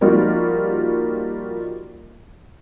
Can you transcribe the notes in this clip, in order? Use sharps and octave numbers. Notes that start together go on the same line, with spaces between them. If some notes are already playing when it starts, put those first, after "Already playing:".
F3 G3 A#3 D#4 F4 F#4